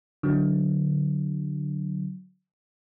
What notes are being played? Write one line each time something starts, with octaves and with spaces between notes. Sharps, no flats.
D3 F#3